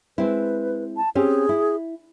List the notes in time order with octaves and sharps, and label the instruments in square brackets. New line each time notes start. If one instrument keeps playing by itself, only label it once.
[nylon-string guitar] G#3 C4 E4 [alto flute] B4
[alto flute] A5
[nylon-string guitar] C4 C#4 G4 [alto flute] G#4
[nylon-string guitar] E4